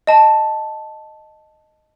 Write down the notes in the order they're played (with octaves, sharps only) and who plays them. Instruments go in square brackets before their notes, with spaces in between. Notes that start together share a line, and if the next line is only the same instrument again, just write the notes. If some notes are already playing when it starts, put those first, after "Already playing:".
[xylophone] D#5 A5